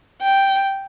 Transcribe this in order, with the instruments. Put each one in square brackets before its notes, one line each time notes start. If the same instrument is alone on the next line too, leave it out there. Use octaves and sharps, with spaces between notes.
[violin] G5